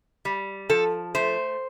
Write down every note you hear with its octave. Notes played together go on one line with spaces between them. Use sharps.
G3
F3 A4
A3 C5